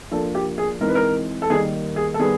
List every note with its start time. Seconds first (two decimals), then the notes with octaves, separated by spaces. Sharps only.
0.11 F3 A#3 D4 A4
0.35 G4
0.58 G#4
0.81 E3 G#3 C4 D#4 A#4
0.88 B4
0.95 A#4
1.42 A4
1.50 D#3 G3 A#3 D#4 G#4
1.96 G#4
2.14 A4
2.19 D#3 G3 B3 G#4